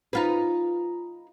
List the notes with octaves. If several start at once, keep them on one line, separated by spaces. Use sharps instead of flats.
D#4 F4 B4